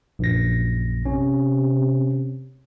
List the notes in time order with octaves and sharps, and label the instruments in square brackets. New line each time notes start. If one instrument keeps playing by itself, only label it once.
[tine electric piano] A#1 F#2 A#6
[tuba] C3 [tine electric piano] C#4